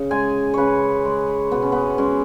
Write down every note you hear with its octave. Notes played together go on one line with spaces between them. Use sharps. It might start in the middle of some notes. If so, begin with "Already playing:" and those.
Already playing: C#3
G#3 G#5
C#3 B4 C#5
G#3
B2 B3
C#4
B3
G#3 C#4